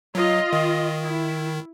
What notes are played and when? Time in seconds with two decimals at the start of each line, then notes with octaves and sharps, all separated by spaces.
0.15 F#3 F4 D#5
0.53 D#3
1.03 E4